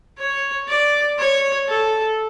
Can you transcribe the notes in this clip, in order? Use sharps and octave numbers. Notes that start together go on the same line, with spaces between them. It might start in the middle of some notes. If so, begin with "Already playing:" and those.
C#5
D5
C#5
A4